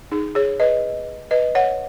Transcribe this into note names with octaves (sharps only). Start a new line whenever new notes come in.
D#4 G#4
G#4 C#5
B4 D#5
B4 D#5
C#5 F#5